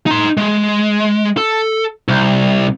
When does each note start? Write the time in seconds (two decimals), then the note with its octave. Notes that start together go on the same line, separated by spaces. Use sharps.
0.06 D#4 C6
0.37 G#3
1.37 A4
2.08 C2